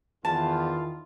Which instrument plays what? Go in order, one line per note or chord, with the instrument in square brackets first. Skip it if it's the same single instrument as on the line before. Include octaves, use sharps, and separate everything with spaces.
[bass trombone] E2 [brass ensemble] D#3 E4 F4 [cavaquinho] A5